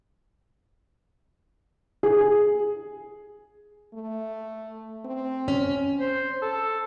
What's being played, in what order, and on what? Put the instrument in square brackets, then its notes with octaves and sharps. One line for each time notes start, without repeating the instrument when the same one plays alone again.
[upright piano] G#4
[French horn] A3
C4
[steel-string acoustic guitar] C#4
[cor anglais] C5
A4